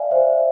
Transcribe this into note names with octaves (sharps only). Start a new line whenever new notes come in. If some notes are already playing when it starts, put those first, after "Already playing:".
Already playing: D5 E5 F5 G#5
C5 E5